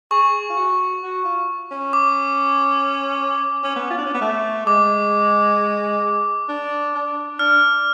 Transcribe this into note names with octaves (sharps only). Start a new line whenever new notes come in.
G#4 C#6
F4
F#4
F#4
F4
C#4
D6
C#4
B3
F4
D4
C#4
B3
A3
G#3 D6
D4
D4
D4 F6